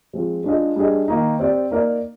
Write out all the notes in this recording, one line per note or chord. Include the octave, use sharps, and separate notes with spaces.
F3 G#3 C4 F4
G#3 D4 F4 G#4 D#5
G3 D4 G#4 D#5
D#3 A#3 D#4
C4 G4 D5
A#3 D#4 A#4 D5